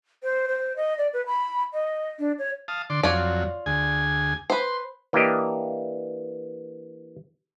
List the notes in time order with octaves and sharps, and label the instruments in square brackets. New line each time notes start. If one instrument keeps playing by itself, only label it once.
[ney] C5
C5
D#5
D5
B4
B5
D#5
D4
C#5
[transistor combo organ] F5 A5 D#6
D3 D5 C6
[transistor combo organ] F2 F#3 [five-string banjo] F4 C#5 D5
[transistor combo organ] D2 G#4 G#5
[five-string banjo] B4 C5 [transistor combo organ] C6
[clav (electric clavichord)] E3 A#3 D4 G4 D#5